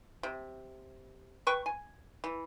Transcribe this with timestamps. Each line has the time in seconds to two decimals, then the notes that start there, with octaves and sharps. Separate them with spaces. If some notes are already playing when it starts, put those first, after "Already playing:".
0.23 C3
1.47 B4 G5 C#6
1.66 G#5
2.24 E3